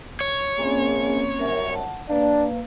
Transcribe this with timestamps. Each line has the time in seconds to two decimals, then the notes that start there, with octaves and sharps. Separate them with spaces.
0.21 C#5
0.58 A#1 A#3 C4 C#4 G#4
1.40 C2 F#2 A#4 C5 E5
1.72 F#5 A5
2.09 A#3 D4 B4 F5